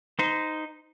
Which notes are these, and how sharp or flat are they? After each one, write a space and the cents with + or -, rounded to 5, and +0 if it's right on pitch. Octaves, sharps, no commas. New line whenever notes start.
D#4 +0 C5 -30